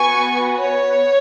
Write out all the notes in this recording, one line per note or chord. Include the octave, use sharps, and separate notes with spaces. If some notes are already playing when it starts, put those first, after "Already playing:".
Already playing: B3 F#4 G#5 C#6
C#5